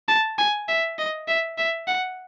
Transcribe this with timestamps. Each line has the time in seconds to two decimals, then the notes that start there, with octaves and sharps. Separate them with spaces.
0.08 A5
0.38 G#5
0.68 E5
0.99 D#5
1.28 E5
1.58 E5
1.88 F#5